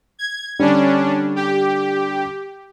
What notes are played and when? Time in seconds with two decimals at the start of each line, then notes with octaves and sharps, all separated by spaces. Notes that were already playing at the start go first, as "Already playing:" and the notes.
0.19 G#6
0.59 D3 G3 C#4 D4
1.36 G4